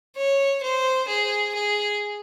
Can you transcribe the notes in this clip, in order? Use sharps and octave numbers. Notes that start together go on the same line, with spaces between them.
C#5
C5
G#4
G#4